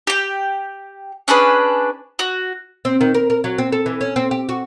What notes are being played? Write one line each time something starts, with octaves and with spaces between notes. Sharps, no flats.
G4 G5
C#4 D4 G#4 B4
F#4
C4
D#3
A#4
A#4
F#3
C4
A4
E3
C#4
C4
G4
F#4